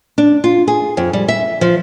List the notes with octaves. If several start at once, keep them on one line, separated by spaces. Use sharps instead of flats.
D4
F4
G#4
F2
G3
E5
F3